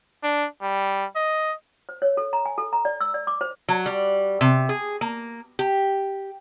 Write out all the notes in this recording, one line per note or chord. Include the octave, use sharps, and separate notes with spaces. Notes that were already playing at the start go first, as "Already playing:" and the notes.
D4
G3
D#5
C5
C#5
A4
A#5
G#5
A4
A#5
D5
E6
D5
D6
C5
F#3
G3
C3
G#4
A#3
G4